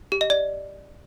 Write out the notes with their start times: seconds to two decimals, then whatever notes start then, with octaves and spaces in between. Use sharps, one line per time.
0.12 G4
0.21 D#5
0.30 D5